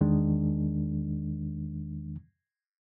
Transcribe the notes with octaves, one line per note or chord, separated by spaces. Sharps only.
E2 D#3 G#3 D4